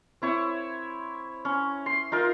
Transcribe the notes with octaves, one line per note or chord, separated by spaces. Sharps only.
C4 E4 C#5
C#4
C6
D#4 F4 A#4